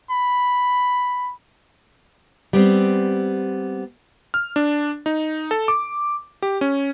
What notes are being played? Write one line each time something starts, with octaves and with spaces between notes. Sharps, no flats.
B5
G3 B3 C4
F6
D4
D#4
A4
D6
G4
C#4